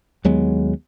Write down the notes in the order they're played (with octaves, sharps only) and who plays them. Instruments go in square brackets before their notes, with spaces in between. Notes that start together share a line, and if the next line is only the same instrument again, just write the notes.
[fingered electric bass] D#2 F#3 G#3 B3